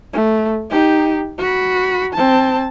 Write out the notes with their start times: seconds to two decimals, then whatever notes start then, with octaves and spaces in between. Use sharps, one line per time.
0.13 A3
0.71 D#4 G4
1.38 F#4 B5
2.13 C4 A5